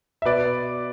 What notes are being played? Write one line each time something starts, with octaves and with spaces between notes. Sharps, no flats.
E5
B2 B4 D5